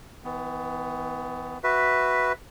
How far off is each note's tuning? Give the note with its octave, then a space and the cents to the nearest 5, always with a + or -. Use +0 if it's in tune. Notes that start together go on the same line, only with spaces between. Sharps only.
E3 -35 B3 +20
F#4 +0 B4 +0 E5 +0